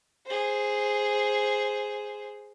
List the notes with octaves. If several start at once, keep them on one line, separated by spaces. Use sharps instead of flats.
G#4 C5